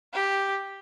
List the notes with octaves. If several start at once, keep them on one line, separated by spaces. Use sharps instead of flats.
G4